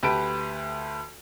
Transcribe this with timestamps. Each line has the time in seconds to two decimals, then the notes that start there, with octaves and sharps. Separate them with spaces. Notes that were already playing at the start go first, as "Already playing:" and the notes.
0.03 D2 G4 B4 A5 D7